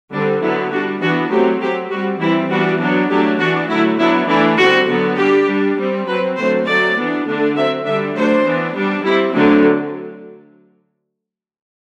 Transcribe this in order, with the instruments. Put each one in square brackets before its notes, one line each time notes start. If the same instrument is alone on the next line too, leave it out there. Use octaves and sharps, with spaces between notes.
[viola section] D3 G3 C4 D4
D3 F#3 B3 E4
G3 D4 F#4
E3 B3 D4 F#4
F#3 A3 C4 G4
F#3 C4 G4
G3 C4 F#4
E3 G3 C4 E4
E3 G3 B3 D4 F#4
F#3 B3 D4
F#3 A3 D4 G4
E3 B3 D4 F#4
D3 F#3 A3 E4
F#3 B3 D4 E4
E3 A3 D4 E4
D3 G3 C4 F#4
D3 F#3 B3
G3 D4 G4
G3 D4
G3 C4
F#3 C4 B4
D3 F#3 A3 C4 C5
F#3 A3 C4 D5
E3 B3 D4
D3 A3 D4
F#3 C4 E5
D3 G3 D4 E5
F#3 A3 D4 C5
E3 B3 D4
G3 D4
G3 C4 E4
D3 F#3 A3 C4 D4